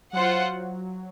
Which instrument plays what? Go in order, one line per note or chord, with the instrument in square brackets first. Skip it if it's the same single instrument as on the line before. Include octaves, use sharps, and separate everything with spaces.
[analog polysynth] F#3 [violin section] F4 C5 F#5